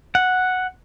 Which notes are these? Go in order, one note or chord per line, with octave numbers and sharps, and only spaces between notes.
F#5